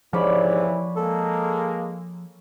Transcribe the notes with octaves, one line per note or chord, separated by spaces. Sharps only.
D#2 G#2 C3 E3 F3 C#5 D5 B5
G#3 A#3 A4